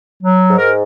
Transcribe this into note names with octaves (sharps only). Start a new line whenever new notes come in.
F#3
G#2
A#4